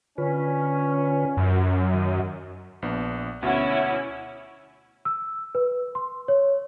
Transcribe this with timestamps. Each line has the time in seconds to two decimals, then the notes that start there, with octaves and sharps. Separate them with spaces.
0.18 D3 C#4 F4 B4
1.37 F#2
1.94 D#3 D#5
2.82 A#1 B3 D4
3.43 D2 B2 C#4 E4 E5 F#5
5.05 E6
5.55 B4
5.95 C6
6.28 C#5